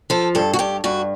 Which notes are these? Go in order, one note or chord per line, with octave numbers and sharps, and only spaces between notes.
F3 A4
G2 A4
F#4
G2 G4
G2 F#4